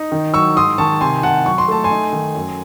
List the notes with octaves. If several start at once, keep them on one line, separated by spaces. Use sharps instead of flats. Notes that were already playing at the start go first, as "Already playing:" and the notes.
Already playing: D#4
D#3
F#3 C#6 E6
G#2 C6 D#6
D#3 A5 C#6
C3 G#5 C6
C3 F#5 A5
F#3 C#6
C6
A3 A5
G#5 C6
D#4
D#3
F#2